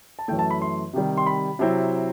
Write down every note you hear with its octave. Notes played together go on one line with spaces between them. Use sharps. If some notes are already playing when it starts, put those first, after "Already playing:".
A5
F#2 E3 A3 G5
A5
B5
C6
C3 D#3 G3
C6
B5
C3 F#3 C4 E4